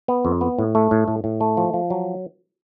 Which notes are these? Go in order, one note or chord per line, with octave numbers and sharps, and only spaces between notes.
B3
F2
B3
A2
A3
A2
A2
A2
A3
F3
F3
F#3